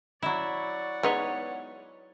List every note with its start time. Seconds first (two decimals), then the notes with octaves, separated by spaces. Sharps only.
0.22 F#3 E4 D5 F#5 C#6
1.03 G#3 B3 D#4 C#5